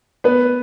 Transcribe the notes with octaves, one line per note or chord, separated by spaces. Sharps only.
B3 B4